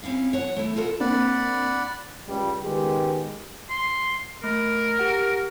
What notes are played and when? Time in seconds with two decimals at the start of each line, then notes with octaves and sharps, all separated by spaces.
0.03 C4 C#4 E4 F5
0.33 C#5 F#5
0.56 A3 E4
0.76 F4 A4 A#4 F#5
1.00 A#3 C4 D4 D5 F#5 B5
2.28 C#2 G3
2.63 C#2 D#3 G#3 B3 G4
3.70 C6
4.44 A3 A#4
4.99 G4 F#5